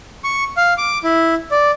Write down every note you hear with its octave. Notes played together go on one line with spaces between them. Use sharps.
C#6
F5
D6
E4
D5